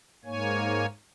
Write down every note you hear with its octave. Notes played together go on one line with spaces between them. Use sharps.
G#2 A#3 C#5 G#5